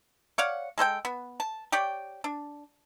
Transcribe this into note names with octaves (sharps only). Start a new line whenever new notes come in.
C#5 D5 F5 F#5
G#3 A4 C5 G5
B3
A5
G4 C#5 D5 G5
D4